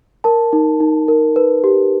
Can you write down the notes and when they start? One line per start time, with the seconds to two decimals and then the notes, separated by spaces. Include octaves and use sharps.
0.24 A#4 A5
0.53 D#4
0.80 D#4
1.08 A#4
1.36 B4
1.64 G4